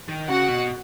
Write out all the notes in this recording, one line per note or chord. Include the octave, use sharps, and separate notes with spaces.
D#3
C#3 F#4 F#5
B2